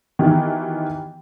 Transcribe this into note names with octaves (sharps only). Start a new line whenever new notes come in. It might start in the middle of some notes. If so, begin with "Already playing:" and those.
D#3 E3 B3 D#4 F#4 G4